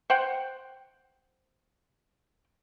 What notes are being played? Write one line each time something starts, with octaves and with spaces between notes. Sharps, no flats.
C5 F#5 G5